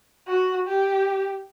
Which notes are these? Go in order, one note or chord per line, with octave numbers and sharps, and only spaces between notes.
F#4
G4